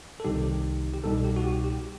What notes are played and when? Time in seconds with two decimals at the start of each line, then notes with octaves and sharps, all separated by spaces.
0.20 A4
0.24 C2 C3 D#3 G3 D#4 G4
0.94 G4
1.04 C2 B2 G3 D#4 A4
1.24 G4
1.36 F#4
1.44 G4
1.64 G4